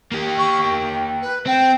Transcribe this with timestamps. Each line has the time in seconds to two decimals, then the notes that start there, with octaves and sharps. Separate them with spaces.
0.12 A#3 G4
0.38 C#6
0.61 G5
1.22 B4
1.47 C4 G5